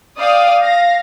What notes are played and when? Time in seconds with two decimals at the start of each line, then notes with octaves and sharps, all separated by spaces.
0.19 D5 F5 G5 D#6
0.63 F5 A#6